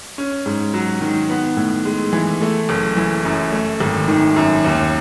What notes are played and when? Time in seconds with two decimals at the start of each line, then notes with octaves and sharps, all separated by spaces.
0.18 C#4
0.46 G#2
0.74 F#3
1.01 D#3
1.30 B3
1.57 A2
1.85 G#3
2.13 E3
2.41 A3
2.69 F#1
2.97 E3
3.25 F#2
3.52 A3
3.81 G#1
4.08 D#3
4.36 F#2
4.65 D#2